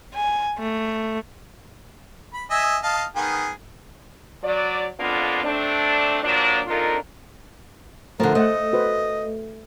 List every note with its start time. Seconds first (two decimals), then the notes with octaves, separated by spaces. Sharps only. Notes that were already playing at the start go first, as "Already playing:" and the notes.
0.14 G#5
0.59 A3
2.34 B5
2.51 D#5 E5 G#5
2.83 D#5 F5 A5
3.16 D#3 B3 G#4
4.43 F#3 D5
4.99 F2 A#3 B3 D4 F4
5.44 A3 C4 D4
6.24 A#2 F3 F#3 D4
6.66 F2 D4 D#4 F4 A#4
8.20 D3 F3 A3 A#4
8.35 A3 C5 D#5 F#5
8.73 F#4 B4 C5